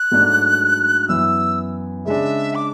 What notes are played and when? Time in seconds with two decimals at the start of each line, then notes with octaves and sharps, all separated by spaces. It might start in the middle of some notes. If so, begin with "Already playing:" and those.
Already playing: F#6
0.11 G#2 F#3 A3 D4
1.09 F#2 E3 B3 E4 E6
2.06 C#3 G#3 D4 E5
2.55 D6